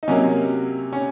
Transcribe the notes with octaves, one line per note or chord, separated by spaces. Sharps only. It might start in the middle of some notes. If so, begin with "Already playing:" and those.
D#4
C3 F#3 A#3 C#4
C#4